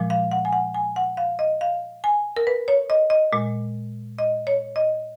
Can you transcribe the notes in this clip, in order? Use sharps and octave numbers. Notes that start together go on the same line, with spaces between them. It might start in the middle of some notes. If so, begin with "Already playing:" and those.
Already playing: A#2 F3 G#3
F5
F#5
G#5
F#5
G#5
F#5
F5
D#5
F5
G#5
A#4
B4
C#5
D#5
D#5
A#2 G#3
D#5
C#5
D#5